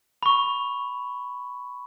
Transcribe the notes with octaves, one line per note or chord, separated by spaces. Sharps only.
B5 C#6